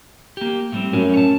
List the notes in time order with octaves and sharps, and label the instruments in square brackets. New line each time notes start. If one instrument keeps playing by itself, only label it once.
[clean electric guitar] A#3 G4
A2 G3 C4
[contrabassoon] F#2 [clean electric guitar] A2 C#4
[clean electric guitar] C#5 A5